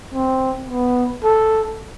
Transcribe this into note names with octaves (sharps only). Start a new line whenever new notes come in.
C4
B3
A4